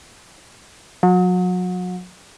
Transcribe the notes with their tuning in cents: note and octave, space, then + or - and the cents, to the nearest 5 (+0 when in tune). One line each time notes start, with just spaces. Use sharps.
F#3 -35